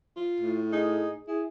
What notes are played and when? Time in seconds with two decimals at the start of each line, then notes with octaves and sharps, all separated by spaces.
0.16 F4
0.40 A2
0.72 D#4 G#4
1.28 E4 G#4